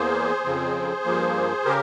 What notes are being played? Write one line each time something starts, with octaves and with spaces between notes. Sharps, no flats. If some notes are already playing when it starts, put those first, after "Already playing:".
Already playing: E2 E3 A#3 G#4 C5
F2 C#3 F3 C4
G2 F3 A#3
C#3 G4 A#4